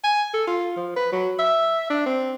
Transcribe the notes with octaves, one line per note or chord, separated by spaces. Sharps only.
G#5
A4
F4
F3
B4
F#3
E5
D4
C4